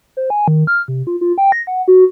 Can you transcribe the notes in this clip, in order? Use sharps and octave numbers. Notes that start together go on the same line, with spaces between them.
C5
G#5
D#3
F6
C3
F4
F4
G5
A#6
F#5
F#4